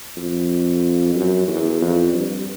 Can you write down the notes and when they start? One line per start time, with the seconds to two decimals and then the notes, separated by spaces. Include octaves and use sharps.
0.17 F2
1.15 F#2
1.48 E2
1.81 F2
2.13 G2